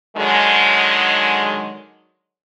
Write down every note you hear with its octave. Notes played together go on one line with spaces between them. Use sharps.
D3 D#3 F#3 G#3